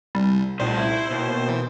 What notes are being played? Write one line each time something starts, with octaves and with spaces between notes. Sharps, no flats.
C2 G3
C2 A#2 D#3 A3 C5
E4
D#2 B2
E3